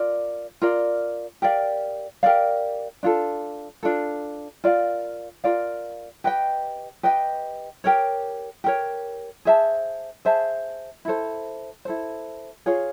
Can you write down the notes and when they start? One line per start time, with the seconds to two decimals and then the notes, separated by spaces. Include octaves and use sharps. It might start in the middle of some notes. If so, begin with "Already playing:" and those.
Already playing: F4 A#4 D5
0.62 F4 A#4 D5
1.42 G4 A#4 D5 F5
2.23 G4 A#4 D5 F5
3.03 D4 F4 A4
3.83 D4 F4 A4
4.64 F4 A#4 D5 F5
5.44 F4 A#4 D5 F5
6.24 G4 B4 D#5 G5
7.03 G4 B4 D#5 G5
7.84 G4 A#4 C#5
8.64 G4 A#4 C#5
9.45 G#4 C5 E5 A5
10.25 G#4 C5 E5 A5
11.05 E4 A4 C5
11.85 E4 A4 C5
12.66 F4 G#4 C#5 F5